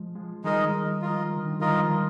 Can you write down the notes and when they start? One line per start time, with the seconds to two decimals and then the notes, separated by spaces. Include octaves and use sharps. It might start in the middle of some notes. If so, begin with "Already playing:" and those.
Already playing: F3 G#3
0.15 F3 G#3
0.44 D#3 G3 G#3 D#4 A#4 D#5
1.02 F4 A#4 D#5
1.36 D3
1.45 D#3
1.53 F3
1.60 D#3 G3 F4 A#4 D#5
1.80 F3 G#3